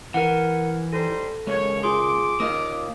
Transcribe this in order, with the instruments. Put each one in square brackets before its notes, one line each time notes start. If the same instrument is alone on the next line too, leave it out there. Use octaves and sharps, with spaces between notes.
[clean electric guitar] E3 [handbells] A#4 F#5
[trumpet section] G3 D#4 C5 [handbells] A4
[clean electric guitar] C#2 G#3 A#3 [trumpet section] C#5
[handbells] F4 G#4 C6 [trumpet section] D6
[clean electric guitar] A#3 D#4 F4 [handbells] D#6